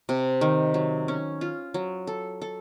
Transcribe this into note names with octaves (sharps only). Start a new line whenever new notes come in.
C3
D#3
F#3
C#4
F4
F#3
A4
A4